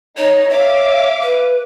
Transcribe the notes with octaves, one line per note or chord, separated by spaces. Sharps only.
D#4 C#5
C#5 E5 F5 D6
B4